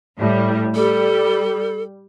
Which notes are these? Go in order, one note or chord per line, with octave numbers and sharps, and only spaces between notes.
A2 G3
G3 A4